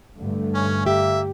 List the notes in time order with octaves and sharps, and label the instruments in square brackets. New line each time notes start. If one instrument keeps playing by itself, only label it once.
[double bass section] G2 D3 A3
[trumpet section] C#4
[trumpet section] A#3 E5 [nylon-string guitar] G4